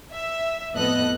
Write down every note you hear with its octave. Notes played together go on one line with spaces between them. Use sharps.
E5
F2 A2 B3 A4 D#5 F#6